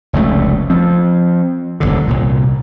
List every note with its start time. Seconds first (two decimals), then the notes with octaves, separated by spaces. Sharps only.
0.13 F1 C#2 A3
0.70 F3 C4
1.80 D#1 B1 D3
2.08 C2 A#2